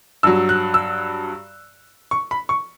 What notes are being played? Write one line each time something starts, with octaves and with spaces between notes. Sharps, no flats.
G2 F#3 E6
F#6
E6
C#6
B5
C#6